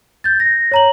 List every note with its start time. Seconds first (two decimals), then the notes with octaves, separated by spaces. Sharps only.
0.24 G6 A6
0.40 A#6
0.71 C#5 A#5 F#7